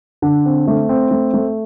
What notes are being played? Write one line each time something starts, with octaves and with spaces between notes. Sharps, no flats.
D3
C4
A3
C4
A3
A3